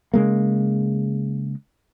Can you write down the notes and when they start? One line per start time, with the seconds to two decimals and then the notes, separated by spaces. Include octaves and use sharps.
0.14 C#3 G#3 A#3